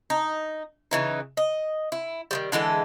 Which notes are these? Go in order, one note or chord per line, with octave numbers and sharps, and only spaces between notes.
D#4
C#3 E3 D#4
D#5
E4
D#3 F3 G3
D3 E3 G#3 A4